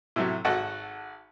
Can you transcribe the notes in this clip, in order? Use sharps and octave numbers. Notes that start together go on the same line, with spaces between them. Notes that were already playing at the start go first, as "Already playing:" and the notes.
A2 C3 F#3
G#1 F#4 A4